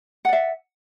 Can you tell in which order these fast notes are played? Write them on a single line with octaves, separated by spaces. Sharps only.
F#5 D5 E5